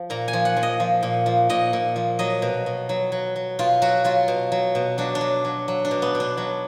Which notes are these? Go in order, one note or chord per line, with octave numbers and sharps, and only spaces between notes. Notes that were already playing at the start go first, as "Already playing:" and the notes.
Already playing: F3
A#2 A#5
G#5
F3
F#5
F3
D#5
F3
A#2
F3
A#2 D#5
A#2
F3
F#3 D#5
B2
B2
F#3
F#3
F#3
B2 F4
F#3 F#4
F#3 F4
B2
F#3
B2
F#3 D4
D4
F#3
F#3
F#3
D4
B2
B3
B2
D4
F#3